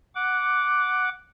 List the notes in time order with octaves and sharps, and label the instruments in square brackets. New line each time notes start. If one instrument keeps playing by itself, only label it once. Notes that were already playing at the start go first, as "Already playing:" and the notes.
[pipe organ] F#5 D6